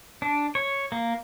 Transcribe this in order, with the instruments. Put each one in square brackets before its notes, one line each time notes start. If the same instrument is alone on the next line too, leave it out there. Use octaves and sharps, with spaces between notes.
[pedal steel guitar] D4
C#5
A#3